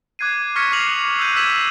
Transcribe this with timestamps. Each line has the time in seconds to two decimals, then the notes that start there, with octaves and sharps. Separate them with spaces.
0.19 D6 F#6 G#6 C7 D#7
0.56 C#6 F6 G#6 A#6 B6 C#7
0.72 D6 F#6 C7 F7 F#7
0.91 D#6 C7
1.19 E6 F#6 G6 D#7 F7
1.36 E6 G#6 B6 D#7 E7 F#7